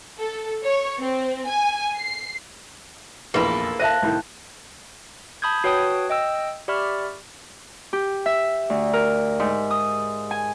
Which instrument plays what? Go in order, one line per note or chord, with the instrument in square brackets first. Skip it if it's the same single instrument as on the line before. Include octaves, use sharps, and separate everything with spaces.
[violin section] A4
C#5
C4
G#5
C7
[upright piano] F1 A#1 E2 [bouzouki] A#3 E4 A4 [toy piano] G#4 B4
[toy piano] C5 E5 F5 [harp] A5 F#6 A#6 [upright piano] D#7
[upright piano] C2 A2 D#3
[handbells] A5 B5 D#6 G6 G#6
F#4 B4 C#5 G5 A5 D#6
D#5 G5 E6
G4 D5 E5 B5 C#6 F6
[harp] G4
E5
D2
A#4
G#2
D#6
G#5